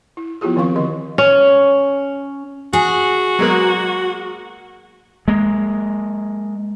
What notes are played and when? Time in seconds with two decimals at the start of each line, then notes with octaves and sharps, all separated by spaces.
0.17 E4
0.41 F3 B3 E4 F4 G4 G#4
0.56 D#3 F3 C4 F5 C#6
0.76 D3 D#3 D#5
1.18 C#4
2.73 F#4 G#4
3.39 F#3 G#3 A#3
5.28 G#3 A#3